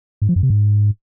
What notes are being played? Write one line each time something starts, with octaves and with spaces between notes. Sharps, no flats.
G#2
F3
F#2
C3
G#2